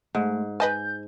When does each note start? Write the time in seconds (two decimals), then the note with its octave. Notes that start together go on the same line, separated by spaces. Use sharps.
0.15 G#2 A3
0.60 B4 D#5 G#5 A5 G6